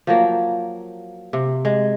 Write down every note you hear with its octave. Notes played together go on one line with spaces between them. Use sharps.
F3 F#3 A#3
C3
G#3